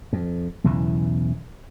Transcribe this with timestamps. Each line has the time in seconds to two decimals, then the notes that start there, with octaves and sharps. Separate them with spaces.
0.13 F2
0.64 B1 E2 C#3 E3